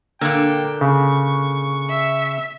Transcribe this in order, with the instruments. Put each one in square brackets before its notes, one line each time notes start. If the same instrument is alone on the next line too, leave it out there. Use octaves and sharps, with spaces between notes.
[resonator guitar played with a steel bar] A#2 D3 [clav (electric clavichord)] A#3 [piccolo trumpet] G5
[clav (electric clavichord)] C#3 [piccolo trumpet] C#6
[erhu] E5